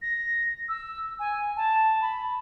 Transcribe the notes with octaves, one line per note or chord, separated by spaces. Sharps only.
A#6
E6
G#5
A5
B5